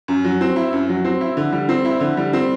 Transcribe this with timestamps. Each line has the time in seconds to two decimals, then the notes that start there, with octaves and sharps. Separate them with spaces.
0.08 F#2
0.25 F#3
0.41 C4
0.56 E4
0.73 F#2
0.89 F#3
1.05 C4
1.21 E4
1.37 D3
1.52 G3
1.69 C4
1.85 E4
2.00 D3
2.17 G3
2.33 C4